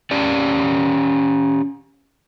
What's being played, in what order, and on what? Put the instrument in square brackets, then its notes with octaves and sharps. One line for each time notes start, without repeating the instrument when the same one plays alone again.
[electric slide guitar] C#4 G4 D5